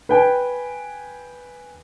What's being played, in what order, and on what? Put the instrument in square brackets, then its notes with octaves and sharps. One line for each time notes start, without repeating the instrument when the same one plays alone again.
[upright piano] B4 G5 G#5